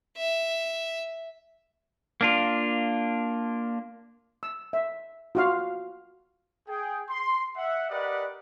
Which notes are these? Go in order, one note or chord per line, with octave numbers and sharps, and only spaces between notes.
E5
A#3 D4 F4
E6
E5
F4 F#4 F5
G#4 G5
C6
E5 F#5
G4 A#4 B4 D5 D#5 F#5